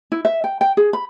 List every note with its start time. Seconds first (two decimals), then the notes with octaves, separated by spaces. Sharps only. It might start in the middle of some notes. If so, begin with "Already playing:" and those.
0.12 E4
0.25 E5
0.44 G5
0.61 G5
0.77 G#4
0.93 B5